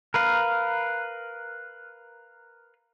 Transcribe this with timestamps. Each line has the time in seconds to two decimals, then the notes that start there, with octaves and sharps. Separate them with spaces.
0.14 A#4 B4 F5